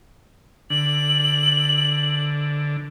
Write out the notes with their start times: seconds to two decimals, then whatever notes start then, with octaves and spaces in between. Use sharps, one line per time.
0.70 D3 F#7